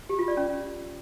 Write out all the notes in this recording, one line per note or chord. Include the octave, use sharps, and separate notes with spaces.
G4
F4
D5
C#4